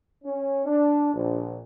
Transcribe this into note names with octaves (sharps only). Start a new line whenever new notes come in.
C#4
D4
A#1